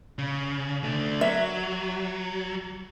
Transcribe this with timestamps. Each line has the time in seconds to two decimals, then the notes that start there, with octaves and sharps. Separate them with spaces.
0.18 C#3
0.84 A3 D4
1.21 F#3 E5